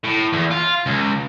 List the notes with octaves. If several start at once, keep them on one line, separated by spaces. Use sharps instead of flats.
A2
E2
F4
C#2